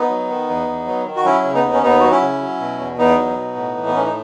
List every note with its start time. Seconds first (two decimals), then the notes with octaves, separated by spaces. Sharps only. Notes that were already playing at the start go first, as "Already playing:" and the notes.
Already playing: B3 D#4
0.09 F#3
0.29 D#3
0.49 E2
0.67 E2
0.87 F#3
1.06 D#3
1.16 F#4
1.24 F#3 C#4 E4
1.44 C#3
1.53 B3 D#4
1.63 D#2
1.73 C#4
1.82 D#2 B3 D#4
2.00 F#3 F#4
2.11 C#4 E4
2.21 C#3
2.41 F#3
2.60 B2
2.78 E2
2.98 E2 B3 D#4
3.17 F#3
3.36 B2
3.56 A2
3.75 E3
3.86 B3
3.94 A2 C#4
4.04 D#4